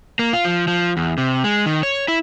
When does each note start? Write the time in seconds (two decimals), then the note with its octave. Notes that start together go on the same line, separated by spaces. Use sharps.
0.19 A#3
0.33 F4
0.45 F3
0.67 F3
0.97 E2
1.18 C3
1.44 G#3
1.66 D#3
1.83 C#5
2.08 E4